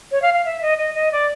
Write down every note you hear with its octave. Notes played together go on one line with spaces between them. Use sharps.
C#5
F5
F5
E5
D#5
D#5
D#5
D5